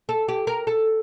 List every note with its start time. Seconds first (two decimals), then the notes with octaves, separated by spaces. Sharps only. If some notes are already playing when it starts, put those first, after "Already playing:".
0.09 A4
0.28 G4
0.47 A#4
0.67 A4